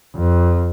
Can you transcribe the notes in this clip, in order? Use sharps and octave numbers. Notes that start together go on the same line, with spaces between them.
F2